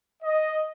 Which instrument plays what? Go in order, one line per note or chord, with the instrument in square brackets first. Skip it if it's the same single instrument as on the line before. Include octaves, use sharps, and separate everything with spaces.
[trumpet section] D#5